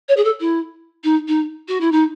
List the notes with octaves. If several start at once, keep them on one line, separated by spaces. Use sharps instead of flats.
C#5
G#4
A4
E4
D#4
D#4
F#4
E4
D#4